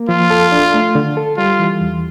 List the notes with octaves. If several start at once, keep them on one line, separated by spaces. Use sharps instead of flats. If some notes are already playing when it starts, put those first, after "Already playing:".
Already playing: A#3
F3 F4
A4
D4
A3
D3
A4
G3 F4
E3
E2